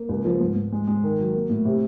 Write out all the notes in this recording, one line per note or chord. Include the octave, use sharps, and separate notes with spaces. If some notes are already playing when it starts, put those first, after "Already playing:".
Already playing: A#3
C#2
F3
G#2
G#2
G#3
G#3
D#3
F#3
A#3
A2
C3